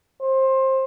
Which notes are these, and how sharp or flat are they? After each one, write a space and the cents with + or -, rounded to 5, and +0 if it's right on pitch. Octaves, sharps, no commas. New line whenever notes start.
C5 +20